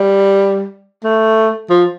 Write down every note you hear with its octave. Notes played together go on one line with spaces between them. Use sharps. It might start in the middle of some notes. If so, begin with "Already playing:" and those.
Already playing: G3
A3
F3